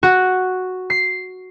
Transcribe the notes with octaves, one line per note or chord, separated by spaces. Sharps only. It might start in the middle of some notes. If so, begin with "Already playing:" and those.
F#4
C7